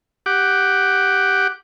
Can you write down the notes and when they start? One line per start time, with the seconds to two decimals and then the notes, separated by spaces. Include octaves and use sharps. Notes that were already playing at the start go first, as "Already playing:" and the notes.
0.26 G4 F#5 D6